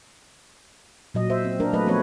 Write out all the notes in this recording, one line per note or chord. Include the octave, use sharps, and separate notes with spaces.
A#2 F#3 D#5
C5 E5
C4
A#3 D4 A#4
F#3 A3 B4 D#5
F3 A3 B3 C4 B4 C#5